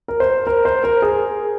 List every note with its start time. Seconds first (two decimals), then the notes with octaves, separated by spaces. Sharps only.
0.08 A#4
0.20 C5
0.47 A#4
0.65 C5
0.84 A#4
1.02 G#4